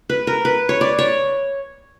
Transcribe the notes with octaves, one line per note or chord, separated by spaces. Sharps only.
B4
A#4
B4
C#5
D5
C#5